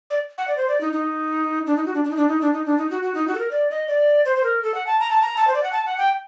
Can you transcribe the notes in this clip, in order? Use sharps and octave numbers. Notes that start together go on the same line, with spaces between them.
D5
F#5
D5
C5
D5
D#4
D#4
D4
D#4
F#4
D4
D4
D#4
D4
D#4
D4
D#4
D4
D#4
F#4
F#4
D#4
F#4
A4
A#4
D5
D#5
D5
C5
C5
A#4
A4
F#5
A5
A#5
A5
A#5
A5
C5
D5
F#5
A5
F#5
G5